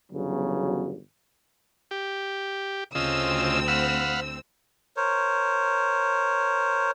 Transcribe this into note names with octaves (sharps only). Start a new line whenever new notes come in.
G1 E2 C#3 F#3
G4
D2 C#3 C4 F4 D#5 E6
F5 F#5 B5
A#4 C5 C#5